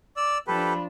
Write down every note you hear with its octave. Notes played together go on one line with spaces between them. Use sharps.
D5 D6 E6
F3 D4 G4 A4 B4 B5